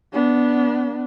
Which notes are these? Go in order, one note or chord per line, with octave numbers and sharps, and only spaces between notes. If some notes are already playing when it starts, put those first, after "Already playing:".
B3 D4